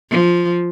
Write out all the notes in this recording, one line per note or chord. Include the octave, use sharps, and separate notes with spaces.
F3